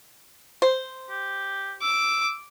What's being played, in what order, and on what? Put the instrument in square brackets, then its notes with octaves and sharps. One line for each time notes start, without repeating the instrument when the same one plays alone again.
[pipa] C5
[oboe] G4
[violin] D6 [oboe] E6